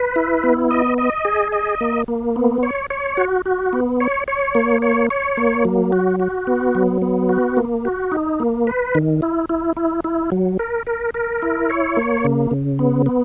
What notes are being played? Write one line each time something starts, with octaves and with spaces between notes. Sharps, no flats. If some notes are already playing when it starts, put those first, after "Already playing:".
Already playing: B4
E4
B3
D#5
D#5
G#4
D#5
A#3
A#3
B3
C#5
C#5
F#4
F#4
B3
C#5
C#5
A#3
C#5
C#5
A#3
F#3
F#4
F#4
B3
F#3
B3
F#4
A#3
F#4
D#4
A#3
B4
D#3
E4
E4
E4
E4
F#3
A#4
A#4
A#4
E4
C#5
A#3
C#3
C#3
B3
B3